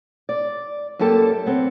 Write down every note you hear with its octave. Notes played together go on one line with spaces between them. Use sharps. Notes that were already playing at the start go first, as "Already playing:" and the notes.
D5
F#2 A#3 G4 A4 A5
B3 C4